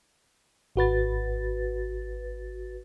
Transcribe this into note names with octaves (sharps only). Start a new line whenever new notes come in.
G#1 F#4 B4 A6